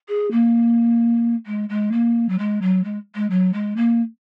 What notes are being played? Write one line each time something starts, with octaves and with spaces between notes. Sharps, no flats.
G#4
A#3
G#3
G#3
A#3
F#3
G#3
F#3
G#3
G#3
F#3
G#3
A#3